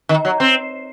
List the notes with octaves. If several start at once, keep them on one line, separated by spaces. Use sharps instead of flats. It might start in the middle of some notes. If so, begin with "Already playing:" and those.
D#3
F#3
C4